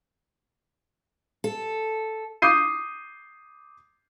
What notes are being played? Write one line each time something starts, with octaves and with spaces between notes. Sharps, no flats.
A4
D6 D#6 G6 C7 D#7